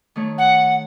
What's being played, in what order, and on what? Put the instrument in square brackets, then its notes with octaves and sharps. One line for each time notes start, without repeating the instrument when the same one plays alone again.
[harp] D#3 A3 C#5
[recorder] F#5